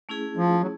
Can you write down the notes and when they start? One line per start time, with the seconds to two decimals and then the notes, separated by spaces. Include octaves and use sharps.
0.09 A3 C#4 E4 G#4
0.37 F3
0.62 F#3